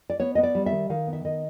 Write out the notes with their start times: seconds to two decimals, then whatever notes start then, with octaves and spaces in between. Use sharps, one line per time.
0.10 D5
0.20 B3 C#5
0.35 B3 D#5
0.43 D5
0.55 G3
0.66 E5
0.72 D#3
0.90 D#3 F5
1.07 B3
1.13 E5
1.25 D#3 D#5